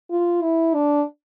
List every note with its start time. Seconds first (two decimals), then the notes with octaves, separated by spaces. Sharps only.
0.11 F4
0.42 E4
0.74 D4